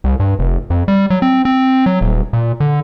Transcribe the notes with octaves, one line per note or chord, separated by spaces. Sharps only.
C2
G2
F1
F2
G3
F#3
C4
C4
F#3
D#1
A#2
D3